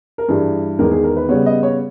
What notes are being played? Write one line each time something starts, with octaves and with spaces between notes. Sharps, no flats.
A#4
G2 E3 G3 G#4
E2 D#3 G#3 A#4
G#4
A#4
B4
C#3 G3 B3 C#5
D#5
C#5